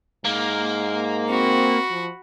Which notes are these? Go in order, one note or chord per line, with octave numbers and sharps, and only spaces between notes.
G#2 A#3
C4 F#4 B5
F3